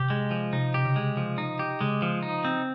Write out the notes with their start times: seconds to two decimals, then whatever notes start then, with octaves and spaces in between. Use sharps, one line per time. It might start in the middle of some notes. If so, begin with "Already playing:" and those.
Already playing: C3 G4
0.10 G#3
0.31 F3
0.52 C3 D#4
0.74 C3 G4
0.85 C#3
0.96 G#3
1.17 F3
1.38 D#4
1.59 G4
1.81 C#3 G#3
2.02 F3
2.23 D#4
2.44 C4